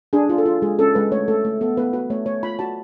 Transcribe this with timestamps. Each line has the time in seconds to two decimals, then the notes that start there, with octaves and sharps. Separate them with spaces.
0.13 D4 G#4
0.29 F4
0.38 A4
0.46 F4
0.62 G#3 G#4
0.79 C#4 A4
0.95 G#3 B4
1.12 A3 C#5
1.28 A3 A4
1.45 A3
1.61 B3 A4
1.77 B3 B4
1.93 F#4 B4
2.10 A3 C#5
2.26 A3 C#5
2.43 F4 B5
2.59 F#4 A5